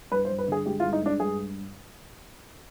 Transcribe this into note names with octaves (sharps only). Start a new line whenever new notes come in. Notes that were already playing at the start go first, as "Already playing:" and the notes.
G2 B4
C5
G2
B4
D3 G#4
G#3 G4
F4
G2
D#4
G#3 D4
G2 G#4